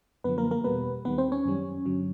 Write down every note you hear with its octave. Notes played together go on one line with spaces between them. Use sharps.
F#2 D3 F3 B3 B4
A#3 A#4
A#3 A#4
E2 B2 G3 B3 B4
D#2 D#3 G3 B3 B4
C4 C5
C#4 C#5
F#2 D#3 G3
G2 D3 F#3